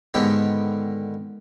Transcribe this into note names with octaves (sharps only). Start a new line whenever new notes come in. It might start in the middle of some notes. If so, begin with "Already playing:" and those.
G#2 D3 D#3 B3 G4 G5